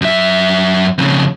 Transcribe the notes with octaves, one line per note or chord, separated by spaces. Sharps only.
F#2 E5
F2 C#3